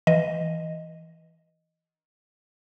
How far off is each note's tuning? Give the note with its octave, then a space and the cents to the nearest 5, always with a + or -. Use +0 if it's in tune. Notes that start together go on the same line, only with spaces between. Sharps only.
E3 +0 D#5 +0